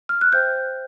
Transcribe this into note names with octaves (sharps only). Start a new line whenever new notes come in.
F6
F#6
C5 E5 G5 G6